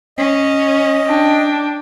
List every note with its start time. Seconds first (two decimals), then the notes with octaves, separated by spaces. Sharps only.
0.18 C#4 D#5
1.07 D4 G5